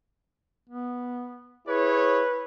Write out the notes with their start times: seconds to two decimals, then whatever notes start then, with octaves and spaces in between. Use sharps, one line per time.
0.69 B3
1.68 E4 G#4 B4 C#5